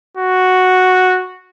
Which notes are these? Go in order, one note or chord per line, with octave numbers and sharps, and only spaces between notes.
F#4